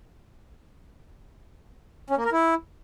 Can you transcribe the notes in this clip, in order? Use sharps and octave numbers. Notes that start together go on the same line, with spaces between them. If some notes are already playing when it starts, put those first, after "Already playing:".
C#4
A#3
A#4
E4